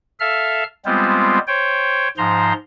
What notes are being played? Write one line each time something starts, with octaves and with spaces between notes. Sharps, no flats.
A4 E5 F5 F6
G3 G#3 B3 C4 F4 C5
C5 C#5 G5
G#2 F3 C5 A#5 C6